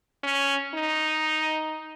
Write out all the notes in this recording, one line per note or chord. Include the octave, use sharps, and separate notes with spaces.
C#4
D#4